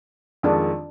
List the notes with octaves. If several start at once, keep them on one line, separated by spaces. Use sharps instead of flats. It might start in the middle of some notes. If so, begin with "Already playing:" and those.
F2 D#3 G#3 D4